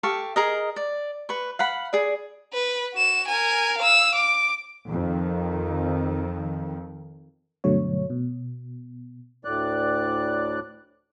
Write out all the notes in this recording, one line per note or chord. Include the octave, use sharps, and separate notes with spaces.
G4 A4 F5 C#6
G#4 A#4 D#5
D5
B4 C#6
F5 F#5 B5
G#4 D5
B4
F#4 E7
A#4 G#5
F5 E6
D6
F2 D#3
G2 B2 D3 F#3 A3 C#5
B2
D2 A2 D5 F#6